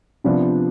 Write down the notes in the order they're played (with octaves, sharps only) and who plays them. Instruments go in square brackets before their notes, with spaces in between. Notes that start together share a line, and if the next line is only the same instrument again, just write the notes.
[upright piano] C3 F3 B3 D4 F4